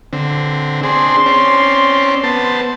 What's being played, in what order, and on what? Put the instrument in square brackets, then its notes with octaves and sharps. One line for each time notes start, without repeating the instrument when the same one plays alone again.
[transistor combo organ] D3 C4
[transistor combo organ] C4 D4 G#4 [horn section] C6
[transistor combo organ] C4 C#4 D5
B3 C5 A5